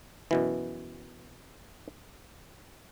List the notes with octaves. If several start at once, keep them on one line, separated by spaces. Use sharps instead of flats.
F#2 B2 E3